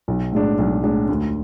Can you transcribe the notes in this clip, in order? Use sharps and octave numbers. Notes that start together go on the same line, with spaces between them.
B1
A2 G#3 D4
B1
A2 G#3 D4
D2